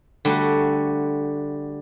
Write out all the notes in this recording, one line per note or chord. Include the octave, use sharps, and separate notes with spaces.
D3 G3 A3 F#4